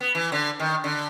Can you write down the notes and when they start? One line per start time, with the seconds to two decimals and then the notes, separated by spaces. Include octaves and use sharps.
0.01 B3
0.15 E3
0.32 D3
0.60 D#3
0.84 D3